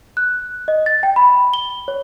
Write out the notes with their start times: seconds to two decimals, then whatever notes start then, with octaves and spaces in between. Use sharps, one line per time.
0.17 F#6
0.68 D#5
0.86 A6
1.03 G5
1.16 B5
1.54 G7
1.88 C#5